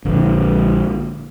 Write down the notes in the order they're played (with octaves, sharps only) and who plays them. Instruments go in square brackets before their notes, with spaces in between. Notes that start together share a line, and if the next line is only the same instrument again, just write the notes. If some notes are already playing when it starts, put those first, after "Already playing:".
[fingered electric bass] A#1 D3